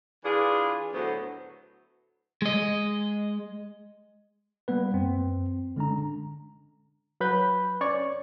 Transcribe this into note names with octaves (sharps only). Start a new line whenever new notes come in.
E3 D4 F4 G#4
D2 A2 F#3 B3 C5
G#3 D#5
G3 A#3 B3 B4
F#2 C4
D3 G#3 C#4 D4 A#5
F#3 B4 B5 G6
C#4 C#5 D5 C#6